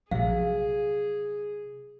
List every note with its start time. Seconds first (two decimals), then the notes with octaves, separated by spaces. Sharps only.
0.11 A#1 C3 F#3 G#4 F5